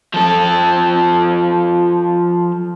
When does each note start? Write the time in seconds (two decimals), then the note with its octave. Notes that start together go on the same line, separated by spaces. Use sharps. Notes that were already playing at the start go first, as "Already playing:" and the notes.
0.14 F3 A4